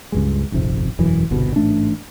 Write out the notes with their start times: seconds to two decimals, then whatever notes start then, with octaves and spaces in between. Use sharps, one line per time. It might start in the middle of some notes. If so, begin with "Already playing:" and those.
0.12 C#2 G2 G#3
0.52 D#1 G#1 F2 C3
0.99 E1 F#2 E3
1.31 G1 C2 B2
1.56 A1 G#2 A3 D4